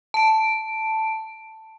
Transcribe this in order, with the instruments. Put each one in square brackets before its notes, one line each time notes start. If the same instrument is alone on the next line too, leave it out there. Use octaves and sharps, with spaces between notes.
[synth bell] A5 D7